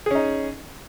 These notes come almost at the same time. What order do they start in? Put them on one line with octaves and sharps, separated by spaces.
G#4 C#4 D#4